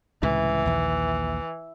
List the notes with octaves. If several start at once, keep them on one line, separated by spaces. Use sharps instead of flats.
C#2 A2 C3 E3
A#1 D#2